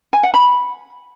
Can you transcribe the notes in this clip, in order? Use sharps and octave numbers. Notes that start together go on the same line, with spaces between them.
G#5
F#5
B5